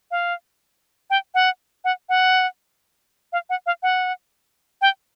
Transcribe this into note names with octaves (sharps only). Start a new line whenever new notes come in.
F5
G5
F#5
F#5
F#5
F5
F#5
F5
F#5
G5